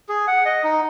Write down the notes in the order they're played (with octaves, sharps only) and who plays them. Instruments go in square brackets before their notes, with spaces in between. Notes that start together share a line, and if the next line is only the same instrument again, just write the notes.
[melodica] G#4
F#5
D#5
D#4